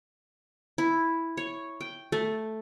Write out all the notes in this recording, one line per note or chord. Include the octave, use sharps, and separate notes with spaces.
E4
C#5
G5
A3